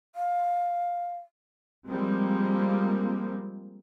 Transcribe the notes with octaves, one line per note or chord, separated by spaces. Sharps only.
F5
F3 G3 G#3 A#3 C4